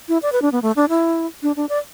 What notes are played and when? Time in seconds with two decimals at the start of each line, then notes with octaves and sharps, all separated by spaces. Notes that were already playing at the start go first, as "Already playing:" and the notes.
0.08 E4
0.23 D5
0.32 B4
0.42 D4
0.52 B3
0.62 A3
0.76 D4
0.89 E4
1.43 D4
1.56 D4
1.69 D5